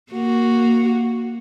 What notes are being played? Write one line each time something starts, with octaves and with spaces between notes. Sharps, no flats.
A#3 F#4